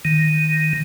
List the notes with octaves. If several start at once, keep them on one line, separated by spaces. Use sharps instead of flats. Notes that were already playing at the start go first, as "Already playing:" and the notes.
D#3